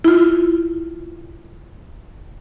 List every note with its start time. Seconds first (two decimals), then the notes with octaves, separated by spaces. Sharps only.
0.04 E4 F4